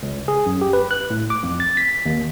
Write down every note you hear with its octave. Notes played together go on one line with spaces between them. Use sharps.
C#2
G#4
F#2
G4
B4
F#6
A2
D6
F2
A6
B6
D#2